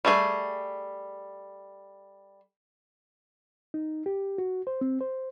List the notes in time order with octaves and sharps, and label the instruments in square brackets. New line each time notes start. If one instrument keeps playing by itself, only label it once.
[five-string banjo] G3 A3 G#4
[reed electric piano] D#4
G4
F#4
C5
C4
C5